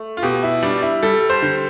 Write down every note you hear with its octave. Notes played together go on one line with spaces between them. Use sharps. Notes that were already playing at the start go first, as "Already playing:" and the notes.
Already playing: A3
F4
B2 G4
E4
G3 D4
E4
G3 A4
C5
D3